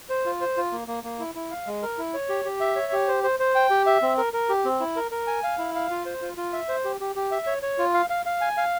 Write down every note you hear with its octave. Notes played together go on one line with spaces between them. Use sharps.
C5
F4
C5
F4
A#3
A#3
A#3
E4
E4
F5
G#3
A#4
E4
C#5
G4
G4
E5
C#5
G4
C5
C5
C5
G5
G4
E5
C4
A#4
A#4
G4
C4
E4
A#4
A#4
G#5
F5
E4
F5
F4
C5
F4
F4
E5
C5
G4
G4
G4
E5
C#5
C#5
F4
F5
F5
F5
G#5
F5